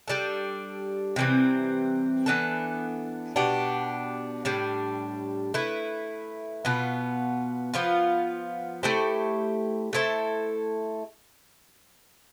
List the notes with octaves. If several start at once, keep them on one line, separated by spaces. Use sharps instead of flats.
G3 D4 A4
C3 E3 G3 C4
E3 B3 D4 A4
B2 B3 D4 G4
A2 G3 D4
A3 E4 B4
B2 B3 F4
F3 B3 F4
A3 E4 G4 C5
A3 E4 A4 C5